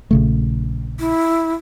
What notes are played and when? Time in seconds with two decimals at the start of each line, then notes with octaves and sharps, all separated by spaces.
0.11 A#1 C#3 A3
1.00 E4